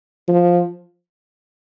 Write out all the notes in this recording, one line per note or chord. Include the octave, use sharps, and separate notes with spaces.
F3